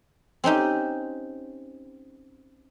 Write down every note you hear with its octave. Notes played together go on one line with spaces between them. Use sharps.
C4 C#4 D#4 G4